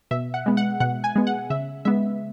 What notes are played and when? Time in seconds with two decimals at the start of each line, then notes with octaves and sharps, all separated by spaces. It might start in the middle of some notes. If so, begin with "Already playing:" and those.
0.11 B2 E5
0.34 F#5
0.46 G#3 B3
0.57 F#5
0.80 B2 F#5
1.04 G#5
1.15 G#3 B3
1.27 F#5
1.50 C#3 E5
1.85 G#3 B3 E5